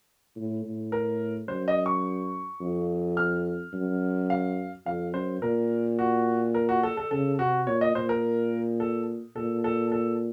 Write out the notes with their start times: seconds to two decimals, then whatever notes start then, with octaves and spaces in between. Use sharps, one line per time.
0.36 A2
0.64 A2
0.92 A#4
1.48 F#2 C5
1.68 D#5
1.86 C#6
2.61 F2
3.17 F6
3.73 F#2
4.30 F5
4.86 F2 F5
5.14 F#2 C5
5.42 A#2 A#4
5.99 F#4
6.54 A#4
6.69 F#4
6.83 A4
6.97 A4
7.11 C#3 A4
7.39 C3 F#4
7.67 A#2 C#5
7.81 D#5
7.95 A#2 C5
8.09 A#4
8.80 A4
9.36 A#2 A4
9.64 A4
9.92 A4